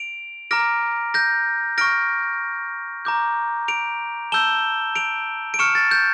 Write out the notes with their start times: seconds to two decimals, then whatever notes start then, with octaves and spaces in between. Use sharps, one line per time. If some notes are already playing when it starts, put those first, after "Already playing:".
Already playing: D7 F7
0.51 A#5 D6 F6 A#6 D7
1.14 G6 A#6
1.78 C#6 F6 A#6 D7
3.05 A#5 D6 G6
3.68 D7 F7
4.32 A5 E6 G6 E7 G7
4.96 D7 F7
5.54 D7
5.59 C#6 F6 C#7 E7
5.75 A6
5.91 G6